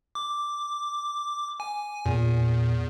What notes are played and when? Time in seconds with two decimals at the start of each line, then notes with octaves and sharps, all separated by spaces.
0.15 D6
1.60 G#5
2.05 E2 A#2